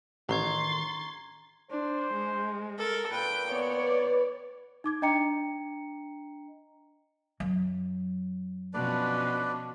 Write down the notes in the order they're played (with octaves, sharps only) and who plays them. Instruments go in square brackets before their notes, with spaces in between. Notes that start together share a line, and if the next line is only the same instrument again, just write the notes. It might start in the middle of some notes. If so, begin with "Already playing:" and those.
[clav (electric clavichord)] A1 [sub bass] D#3 [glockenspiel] A#5 C#6 G#6 [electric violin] C6 A6
[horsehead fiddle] D4 [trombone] C5
[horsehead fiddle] G#3
[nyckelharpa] A4 A#4
[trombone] A#2 [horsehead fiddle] B4 [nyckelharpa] G5
[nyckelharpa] B3 [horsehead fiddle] C#5 D5
[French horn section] B4
[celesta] D#4 D6 G#6
D4 D#5 G5 A#5 C#7
[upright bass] F#2 F#3
[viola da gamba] B2 F3 C#4 [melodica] D4 B4 D5